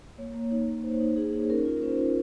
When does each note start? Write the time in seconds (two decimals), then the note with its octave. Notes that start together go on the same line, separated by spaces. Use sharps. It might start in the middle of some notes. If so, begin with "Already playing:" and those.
0.18 A#3 C#5
0.35 A#3
0.51 D#4 C#5
0.67 D#4
0.84 D#4 C5
1.00 D#4
1.16 D#4 G#4
1.33 D#4
1.50 C#4 A#4
1.65 F4
1.82 C#4 C5
1.98 F4